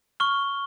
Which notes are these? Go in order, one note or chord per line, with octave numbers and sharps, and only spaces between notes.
C#6 F6 G7